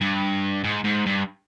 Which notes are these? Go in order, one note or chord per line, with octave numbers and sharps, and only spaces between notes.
G2
G#2
G#2
G2